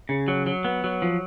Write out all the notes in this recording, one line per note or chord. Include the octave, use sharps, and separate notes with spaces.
C#3
F#3
F#3
B3
F#3
F3